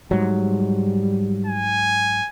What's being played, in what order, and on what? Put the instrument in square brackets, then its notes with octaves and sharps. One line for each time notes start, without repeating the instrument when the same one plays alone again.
[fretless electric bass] G#2 F#3 [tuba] G3
[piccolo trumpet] G#5